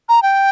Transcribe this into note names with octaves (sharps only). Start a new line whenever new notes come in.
A#5
G5